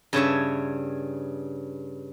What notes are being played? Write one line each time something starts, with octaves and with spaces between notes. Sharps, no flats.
G2 C#3 C#5 E5